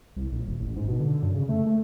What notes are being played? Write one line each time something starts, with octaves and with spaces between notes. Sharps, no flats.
C2
A#1
D#1
A1
G#2
B2
D3
F#2
C#3
A3
A3